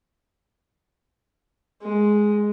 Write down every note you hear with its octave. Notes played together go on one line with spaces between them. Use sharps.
G#3